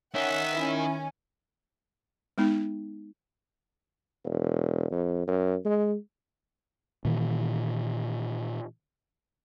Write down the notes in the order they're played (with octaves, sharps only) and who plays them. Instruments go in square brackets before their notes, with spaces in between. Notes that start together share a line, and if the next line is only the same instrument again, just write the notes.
[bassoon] C#4 [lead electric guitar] D#4 A#4 [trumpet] E5 [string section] F#5
[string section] D#3 C#4 [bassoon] E4
[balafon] G#3 B3 D#4
[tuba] E1
F2
F#2
G#3
[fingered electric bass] A#2 D#3 E3